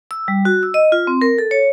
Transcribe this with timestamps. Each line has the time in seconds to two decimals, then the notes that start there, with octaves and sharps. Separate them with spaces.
0.11 E6
0.28 G3
0.45 F#4
0.63 E6
0.74 D#5
0.92 F4
1.07 C4
1.21 A#4
1.38 A4
1.51 C#5